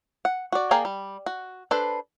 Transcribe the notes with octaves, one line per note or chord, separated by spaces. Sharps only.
F#5
F#4 D5
A#3 G#4 A#4 D5 G5
G3
F#4
D4 A4 B4 C5